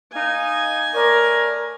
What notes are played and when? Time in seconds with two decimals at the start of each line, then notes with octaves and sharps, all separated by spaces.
0.13 A#3 D#4 G#5
0.94 A3 A#4 C#5 D5